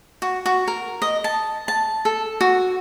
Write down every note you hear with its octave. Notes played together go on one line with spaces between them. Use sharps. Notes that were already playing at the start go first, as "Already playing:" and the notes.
F#4
F#4
A#4
D#5
A5
A5
A4
F#4